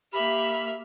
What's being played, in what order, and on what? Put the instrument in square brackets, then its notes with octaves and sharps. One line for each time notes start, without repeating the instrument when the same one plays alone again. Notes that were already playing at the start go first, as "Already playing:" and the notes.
[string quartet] A#3 E5 F6 [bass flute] G4 [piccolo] B5